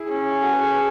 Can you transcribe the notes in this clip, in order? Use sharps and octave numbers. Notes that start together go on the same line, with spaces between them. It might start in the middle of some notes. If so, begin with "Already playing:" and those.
Already playing: E4 G#4
C#4
F#4 A4
G#4 B4
A4 C#5
G#4 B4